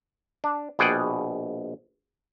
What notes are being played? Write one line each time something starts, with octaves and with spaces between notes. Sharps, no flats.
D4
A#1 B2 G#4 D5 F#5 G5